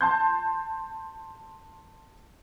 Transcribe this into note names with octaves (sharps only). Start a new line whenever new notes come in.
A5 C6 G6